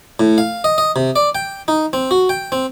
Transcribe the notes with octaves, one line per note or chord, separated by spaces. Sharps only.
A2
F5
D#5
D#5
C3
D5
G5
D#4
C4
F#4
G5
C4